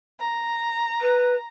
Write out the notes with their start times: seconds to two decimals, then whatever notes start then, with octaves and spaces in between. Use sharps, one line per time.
0.19 A#5
1.01 B4